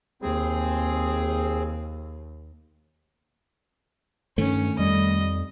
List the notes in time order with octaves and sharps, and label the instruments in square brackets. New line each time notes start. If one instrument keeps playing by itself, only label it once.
[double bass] D#2 [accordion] C4 G#4
[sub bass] G2 [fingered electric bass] D#3 A3 [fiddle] C#4
[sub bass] F2 [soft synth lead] G3 [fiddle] D#5